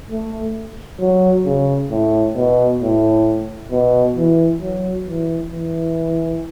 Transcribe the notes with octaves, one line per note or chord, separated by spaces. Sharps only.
A3
F#3
C#3
A2
B2
A2
B2
E3
F#3
E3
E3